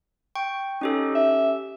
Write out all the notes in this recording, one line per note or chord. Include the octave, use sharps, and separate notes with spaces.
G5 C#6
C#4 D#4 G4 A4
E5